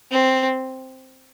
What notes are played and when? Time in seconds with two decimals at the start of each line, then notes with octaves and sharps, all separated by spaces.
0.11 C4